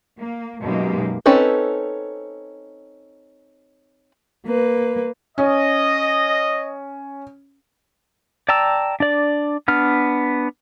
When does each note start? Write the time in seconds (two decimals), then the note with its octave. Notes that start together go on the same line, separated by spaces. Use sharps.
0.17 A#3
0.61 F#2 B2 G#3 A#3 D#4 G4
1.26 C4 C#4 D#4 A4 B4
4.45 A#3 B4
5.38 C#4 D#5
8.49 D5 G5 A5 A#5 E6
9.00 D4 D5
9.68 B3 D4 F6